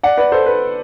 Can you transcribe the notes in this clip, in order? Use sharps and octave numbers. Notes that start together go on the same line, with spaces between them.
D5 F#5
B4 D5
A4 C5
B4